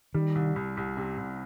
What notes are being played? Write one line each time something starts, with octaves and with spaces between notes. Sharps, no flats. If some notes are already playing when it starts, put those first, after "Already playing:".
D#3 G3
C2
C2
C2
C3
C2